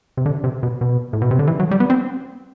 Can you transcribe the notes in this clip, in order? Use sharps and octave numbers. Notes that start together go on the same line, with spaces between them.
C3
D3
C3
B2
B2
A2
B2
C3
D3
E3
F#3
G3
B3
C4